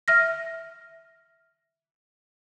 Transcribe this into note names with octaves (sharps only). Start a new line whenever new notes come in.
E5 F6 A#6